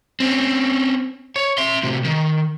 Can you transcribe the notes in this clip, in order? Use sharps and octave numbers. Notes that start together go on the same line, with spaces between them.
C4 C#4
C#5
E5 C6
A2 C3
D#3